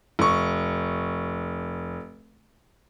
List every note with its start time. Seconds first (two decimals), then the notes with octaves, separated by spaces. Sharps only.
0.19 F1 C#6